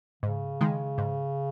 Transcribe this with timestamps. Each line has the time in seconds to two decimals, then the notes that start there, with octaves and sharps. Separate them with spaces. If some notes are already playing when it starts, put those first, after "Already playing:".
0.23 G#2 C#3
0.61 D#3 G#3
0.98 G#2